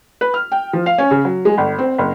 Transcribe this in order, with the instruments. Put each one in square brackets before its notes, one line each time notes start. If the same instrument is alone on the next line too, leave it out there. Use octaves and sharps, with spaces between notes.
[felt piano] B4
F6
G5
F3
F5
C#4
C#3
F#3
G#3
G1
C4
F#1